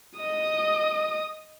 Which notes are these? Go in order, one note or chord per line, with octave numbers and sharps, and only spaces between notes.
D#5 D#6